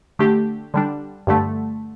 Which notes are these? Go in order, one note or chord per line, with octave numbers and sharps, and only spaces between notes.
D3 A3 D4 G4
D3 G3 D4
G2 D3 A3